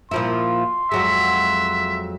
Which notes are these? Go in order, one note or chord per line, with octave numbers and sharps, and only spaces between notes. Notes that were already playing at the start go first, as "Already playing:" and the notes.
A#2 F3 E4 C6
F2 F#3 G#3 E5